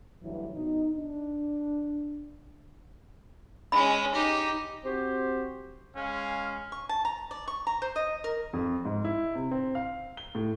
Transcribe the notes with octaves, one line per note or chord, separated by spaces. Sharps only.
D2 G2 E3 F#3 E4
B2 D#4
D4
G#3 C#4 B5
D#4 G4
C4 F#4 G4 C5
G#3 C#4 F5
C#6
A5
A#5
D5
C#6
A#5
C5
D#5
A#4
F2
G#2
E4
C3
C4
F5
G7
A2